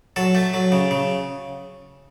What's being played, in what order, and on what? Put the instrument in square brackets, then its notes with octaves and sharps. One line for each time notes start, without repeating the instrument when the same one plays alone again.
[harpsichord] F#3 A4
A3
F#3
C#3
C#3